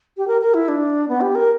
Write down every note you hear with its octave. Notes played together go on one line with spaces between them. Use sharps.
G4
A#4
A#4
E4
D4
B3
G4
A#4